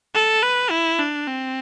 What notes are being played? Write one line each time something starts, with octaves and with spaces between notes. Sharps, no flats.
A4
B4
E4
D4
C4